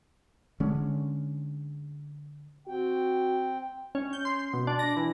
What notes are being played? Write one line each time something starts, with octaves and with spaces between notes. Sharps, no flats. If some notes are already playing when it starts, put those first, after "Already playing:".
D3 G#3 C#4
C4 F#4 G5
C#4
G6
C6
C6
B2
D4
A#6
E3